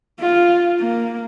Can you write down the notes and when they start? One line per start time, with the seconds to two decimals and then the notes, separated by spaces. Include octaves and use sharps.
0.20 F4
0.79 A#3